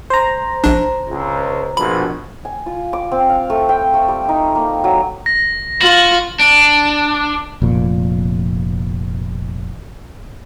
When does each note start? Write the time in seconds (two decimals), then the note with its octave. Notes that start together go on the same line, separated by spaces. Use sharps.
0.10 C5 A#5
0.64 A#1 D4
1.08 C#2
1.77 A#1 B2 B5
2.45 G#5
2.66 F4
2.93 D6
3.11 C4
3.29 F5
3.50 A3
3.69 G5
3.94 A3
4.08 G3
4.29 D#4
4.55 A#3
4.84 F#3
5.26 A#6
5.81 F4 F#4 A#6 F#7
6.40 D4
7.62 F1 A#2